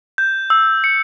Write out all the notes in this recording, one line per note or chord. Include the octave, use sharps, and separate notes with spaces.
G6
E6
C#7